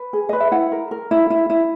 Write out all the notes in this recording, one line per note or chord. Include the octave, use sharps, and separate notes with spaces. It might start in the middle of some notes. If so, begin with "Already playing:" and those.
Already playing: B4
G#4
B4 D#5
E5
E4 F#5
A#4
A#4
E4
E4
E4